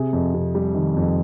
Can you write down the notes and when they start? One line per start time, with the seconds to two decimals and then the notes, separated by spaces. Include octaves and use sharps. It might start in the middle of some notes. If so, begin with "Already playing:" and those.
Already playing: C3 G#4
0.13 F2
0.34 C3
0.55 G3
0.74 D#3
0.96 F2